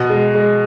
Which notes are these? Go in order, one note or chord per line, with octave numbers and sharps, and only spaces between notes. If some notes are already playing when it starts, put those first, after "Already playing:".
Already playing: B2
G#3
G#3